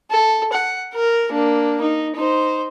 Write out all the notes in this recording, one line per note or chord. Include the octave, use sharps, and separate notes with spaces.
A4
F#5
A#4
A#3 D4
D#4
D#4 C5